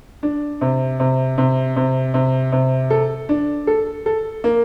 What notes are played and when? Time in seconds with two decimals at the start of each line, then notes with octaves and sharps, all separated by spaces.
0.23 D4
0.61 C3
1.00 C3
1.38 C3
1.76 C3
2.14 C3
2.52 C3
2.90 A4
3.29 D4
3.67 A4
4.06 A4
4.44 A#3